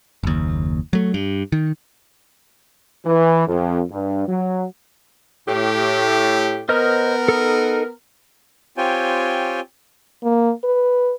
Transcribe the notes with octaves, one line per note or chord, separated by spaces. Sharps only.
F#1 D#2
F#3 A3
G2
D#3
E3
F2
G2
F#3
A2 G4
B3 A#4 C5 D#5 F6
D#4 A4
C4 F4 G4 C#5 G5 G#5
A#3
B4